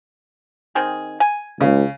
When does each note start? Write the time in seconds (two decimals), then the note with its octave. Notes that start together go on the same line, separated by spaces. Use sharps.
0.75 D#3 C4 G#4
1.20 G#5
1.61 C#2 C#3